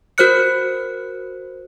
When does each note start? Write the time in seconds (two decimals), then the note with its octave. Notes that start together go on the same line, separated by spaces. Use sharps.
0.18 F#4 A#4 C5 F6 F#6 C#7